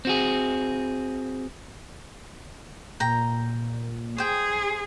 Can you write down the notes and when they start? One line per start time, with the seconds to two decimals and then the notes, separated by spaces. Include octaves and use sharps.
0.05 C4 F#4 G#4
3.00 A#2 G5 A#5
4.18 G#4 C5 G5